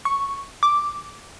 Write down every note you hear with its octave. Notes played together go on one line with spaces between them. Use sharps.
C#6
D6